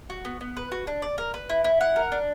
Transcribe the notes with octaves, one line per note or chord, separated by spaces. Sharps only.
F#4
B3
B3
B4
F#4
D4
D5
A#4
B4
E4
E4
F#5
A#4
D4